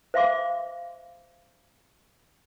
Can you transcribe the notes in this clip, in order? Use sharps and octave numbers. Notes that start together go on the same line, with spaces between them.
C5 E5 F5 C6 D6